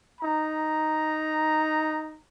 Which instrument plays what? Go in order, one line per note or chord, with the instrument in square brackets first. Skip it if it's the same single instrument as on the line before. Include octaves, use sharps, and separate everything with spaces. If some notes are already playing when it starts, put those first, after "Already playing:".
[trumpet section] D#4 A#5